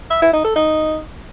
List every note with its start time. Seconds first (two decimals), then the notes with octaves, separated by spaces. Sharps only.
0.10 E5
0.21 E4
0.33 D#4
0.44 A4
0.55 D#4